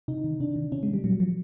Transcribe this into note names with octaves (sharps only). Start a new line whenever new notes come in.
C3 D#4
D#3
C3 D4
D#3
C3 C#4
G#3
D#3
G3
A#2 F#3
F3 F#3